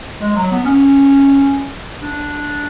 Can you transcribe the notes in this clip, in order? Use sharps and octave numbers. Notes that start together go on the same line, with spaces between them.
G#3
F#3
B3
C#4
D4